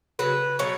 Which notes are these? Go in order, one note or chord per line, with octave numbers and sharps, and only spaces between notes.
C#3 F#3 B4
B2 F#3 C#5